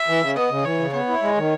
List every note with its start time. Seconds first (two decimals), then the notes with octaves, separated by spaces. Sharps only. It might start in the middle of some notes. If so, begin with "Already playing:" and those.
Already playing: E5
0.08 E3
0.23 C#3
0.36 B3 D#5
0.51 C#3
0.65 E3 C#5
0.79 C#3
0.93 B3 C#5
1.09 E4
1.22 G#3
1.37 D#3